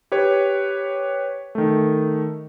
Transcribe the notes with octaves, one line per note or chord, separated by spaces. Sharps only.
G4 B4 C#5
D#3 A3